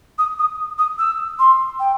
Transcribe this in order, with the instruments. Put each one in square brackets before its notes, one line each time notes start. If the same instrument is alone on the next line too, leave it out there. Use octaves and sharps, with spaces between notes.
[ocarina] D#6
D#6
D#6
E6
C6
G5